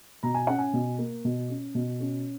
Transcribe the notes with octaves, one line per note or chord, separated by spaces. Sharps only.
B2 A#5
G#5
C#4 F#5
G#5
B2
A#3
B2
C#4
B2
C#4